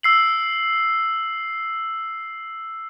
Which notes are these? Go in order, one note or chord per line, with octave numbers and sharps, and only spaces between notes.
E6 C7 F#7